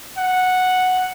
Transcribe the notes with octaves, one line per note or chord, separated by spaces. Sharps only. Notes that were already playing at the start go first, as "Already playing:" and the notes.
F#5